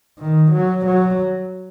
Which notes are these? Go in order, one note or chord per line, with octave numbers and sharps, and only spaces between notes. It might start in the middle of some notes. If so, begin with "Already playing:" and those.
D#3
F#3
F#3